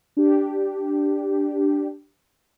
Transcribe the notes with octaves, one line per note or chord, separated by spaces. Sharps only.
D4 G4